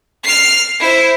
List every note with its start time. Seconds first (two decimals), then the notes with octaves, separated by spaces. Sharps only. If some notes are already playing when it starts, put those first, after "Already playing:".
0.24 F6 C7
0.80 E4 C5